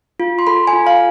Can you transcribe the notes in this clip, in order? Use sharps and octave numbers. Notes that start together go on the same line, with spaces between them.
F4
C6
A4 B5
G#5
F4
F5